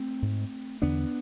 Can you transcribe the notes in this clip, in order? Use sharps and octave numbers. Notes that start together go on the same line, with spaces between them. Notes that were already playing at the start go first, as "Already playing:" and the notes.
Already playing: A3 C4
G#2
E2 D3 B3 D4